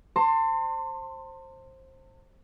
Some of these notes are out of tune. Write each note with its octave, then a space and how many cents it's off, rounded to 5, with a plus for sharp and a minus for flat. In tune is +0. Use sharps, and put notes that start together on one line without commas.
C5 +20 A5 +40 C6 +0